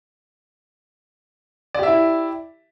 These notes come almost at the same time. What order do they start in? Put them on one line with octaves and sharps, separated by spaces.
D5 G4 E5 E4